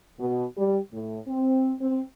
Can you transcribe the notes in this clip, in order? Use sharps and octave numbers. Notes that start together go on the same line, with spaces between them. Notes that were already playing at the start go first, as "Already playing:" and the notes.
B2
G3
A2
C4
C4